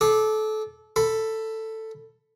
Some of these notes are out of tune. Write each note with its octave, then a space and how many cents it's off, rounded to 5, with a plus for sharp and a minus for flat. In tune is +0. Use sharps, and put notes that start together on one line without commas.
A4 -25 D6 +15
A4 +10 B5 +0